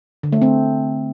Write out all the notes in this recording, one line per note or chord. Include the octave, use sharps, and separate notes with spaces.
D3
A3
C4